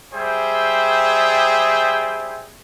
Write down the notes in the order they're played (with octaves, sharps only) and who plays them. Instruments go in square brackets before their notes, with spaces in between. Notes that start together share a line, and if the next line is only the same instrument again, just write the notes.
[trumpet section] G3 G#4 C5 E5 G5